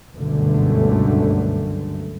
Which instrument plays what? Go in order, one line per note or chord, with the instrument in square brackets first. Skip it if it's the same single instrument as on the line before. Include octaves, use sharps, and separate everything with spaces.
[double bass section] G1 C#2 F#2 B2 D3 A3